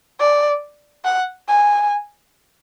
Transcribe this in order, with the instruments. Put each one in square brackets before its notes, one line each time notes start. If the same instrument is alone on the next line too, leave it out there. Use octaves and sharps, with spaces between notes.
[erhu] D5
F#5
G#5